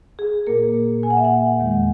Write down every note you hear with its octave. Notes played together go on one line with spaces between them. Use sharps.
G#4
A#2 A#3 A#4
A#2 G#5
A#3 F#5
E5
F#5
E2 D#3 G#3